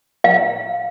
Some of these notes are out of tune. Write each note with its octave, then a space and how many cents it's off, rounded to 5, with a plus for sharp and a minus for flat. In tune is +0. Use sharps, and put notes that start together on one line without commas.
F5 +10